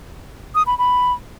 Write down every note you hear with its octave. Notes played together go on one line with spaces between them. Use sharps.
D#6
B5
B5